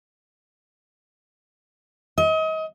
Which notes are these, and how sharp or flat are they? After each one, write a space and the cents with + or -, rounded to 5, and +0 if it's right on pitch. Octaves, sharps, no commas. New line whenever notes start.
D#5 +35